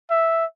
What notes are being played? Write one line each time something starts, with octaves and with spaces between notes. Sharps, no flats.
E5